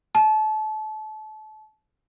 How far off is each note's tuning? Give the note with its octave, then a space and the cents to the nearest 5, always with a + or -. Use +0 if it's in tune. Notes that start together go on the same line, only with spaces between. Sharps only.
A5 -30